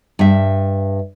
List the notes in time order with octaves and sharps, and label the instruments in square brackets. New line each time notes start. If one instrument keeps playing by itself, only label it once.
[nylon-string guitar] G2 E5